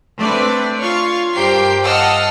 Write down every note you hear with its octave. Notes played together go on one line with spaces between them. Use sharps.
A3 C4 D4 B4 D5
F4 C#5 F5 C6 C#6
G2 G4 A#4 C5 G5 C7
D#5 F5 F#5 A5 E6 F6